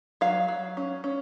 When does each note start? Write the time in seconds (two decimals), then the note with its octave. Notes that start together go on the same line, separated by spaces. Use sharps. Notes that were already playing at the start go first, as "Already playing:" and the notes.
0.21 F#3 F5
0.48 F#3
0.77 C#4
1.04 C#4